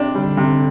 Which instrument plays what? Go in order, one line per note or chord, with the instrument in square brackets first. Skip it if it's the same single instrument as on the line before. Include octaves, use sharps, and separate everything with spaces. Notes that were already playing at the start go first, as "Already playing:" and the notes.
Already playing: [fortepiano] C3 D4
[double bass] D3 [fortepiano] G3
[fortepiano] C3